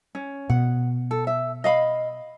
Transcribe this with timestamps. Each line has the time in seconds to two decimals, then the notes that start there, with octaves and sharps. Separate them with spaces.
0.15 C#4
0.50 B2 F#5
1.11 A4
1.27 E5
1.64 D#5 F5 B5